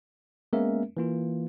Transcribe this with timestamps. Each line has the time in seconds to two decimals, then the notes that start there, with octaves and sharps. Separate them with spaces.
0.53 G#3 A#3 B3 C#4 A#4 E5
0.97 E3 A#3 F4